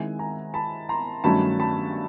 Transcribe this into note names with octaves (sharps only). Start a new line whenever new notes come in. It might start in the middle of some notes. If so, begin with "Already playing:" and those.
Already playing: D#3 G#3 C4 E4 F#5 G#5
G#5 A#5
A5 B5
A#5 C6
G2 D#3 F#3 A3 C#4 A5 B5
A5 B5